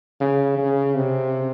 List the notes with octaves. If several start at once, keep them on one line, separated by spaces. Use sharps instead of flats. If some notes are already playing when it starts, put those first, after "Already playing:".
C#3
C#3
C3